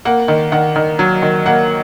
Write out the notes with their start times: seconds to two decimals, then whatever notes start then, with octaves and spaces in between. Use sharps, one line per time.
0.05 A#3 F#5
0.28 D#3
0.52 D#3 F#5
0.76 D#3
0.99 F#3
1.22 D#3
1.46 A#3 F#5